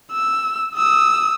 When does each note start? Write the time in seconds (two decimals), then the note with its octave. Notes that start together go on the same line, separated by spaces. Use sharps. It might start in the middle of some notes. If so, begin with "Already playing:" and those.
0.12 E6
0.76 D#6 E6